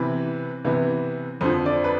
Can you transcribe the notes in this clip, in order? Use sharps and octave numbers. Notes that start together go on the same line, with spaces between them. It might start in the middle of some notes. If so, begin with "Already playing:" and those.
Already playing: C3 E3 B3 B4
C3 E3 B3
F2 D3 F3 C5
D5
B4